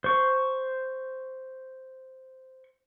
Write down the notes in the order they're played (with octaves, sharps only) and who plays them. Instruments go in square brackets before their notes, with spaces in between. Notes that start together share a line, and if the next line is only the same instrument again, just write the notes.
[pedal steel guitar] C5 C#6